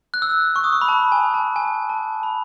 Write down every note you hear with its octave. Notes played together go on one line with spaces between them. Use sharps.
F#6
E6
C#6
D#6
C#6
B5
A5
G#5
A5
G#5
A5
B5